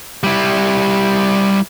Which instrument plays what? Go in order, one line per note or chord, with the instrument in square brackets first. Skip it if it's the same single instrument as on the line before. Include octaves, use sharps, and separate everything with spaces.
[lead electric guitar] G3 E4